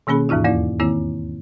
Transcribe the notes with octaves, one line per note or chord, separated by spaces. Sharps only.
B2 D#3 A#3 C#4 G#4 B5
D#2 G#2 E3 D#4 F4
E2 A#3 E4 D5
D#3 A#3 C4 E4